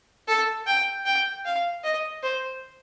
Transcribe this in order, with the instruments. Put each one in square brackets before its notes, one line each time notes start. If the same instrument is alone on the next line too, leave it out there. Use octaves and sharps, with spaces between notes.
[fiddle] A4
G5
G5
F5
D#5
C5